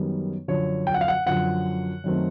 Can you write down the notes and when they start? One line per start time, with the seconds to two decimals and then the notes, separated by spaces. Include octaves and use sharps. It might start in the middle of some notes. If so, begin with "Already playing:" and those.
Already playing: F#2 D#3 G3 B3
0.48 F#2 D3 F3 C#5
0.87 G5
0.94 F#5
1.01 F5
1.08 F#5
1.26 F#2 D3 F3 F#5
2.04 F#2 D#3 F#3 A3 C4